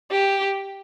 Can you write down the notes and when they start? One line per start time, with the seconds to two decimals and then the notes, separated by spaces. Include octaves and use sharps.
0.11 G4